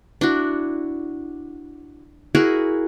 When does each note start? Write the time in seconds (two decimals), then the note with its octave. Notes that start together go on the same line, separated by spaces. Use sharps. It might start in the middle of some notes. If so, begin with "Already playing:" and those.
0.21 D4 E4 F#4
2.35 E4 F#4 G#4 A#4